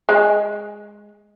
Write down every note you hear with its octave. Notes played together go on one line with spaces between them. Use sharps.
G#3 G#4